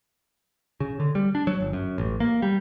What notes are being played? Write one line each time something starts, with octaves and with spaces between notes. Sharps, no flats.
C#3
D3
G3
D4
F#3
G1
F#2
A1
A#3
G3